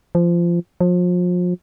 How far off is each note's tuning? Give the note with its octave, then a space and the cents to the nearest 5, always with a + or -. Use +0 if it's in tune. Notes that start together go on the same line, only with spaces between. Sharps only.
F3 -20
F3 +35